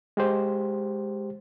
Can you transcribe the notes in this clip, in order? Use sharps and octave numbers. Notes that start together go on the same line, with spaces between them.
G#3 G4 C5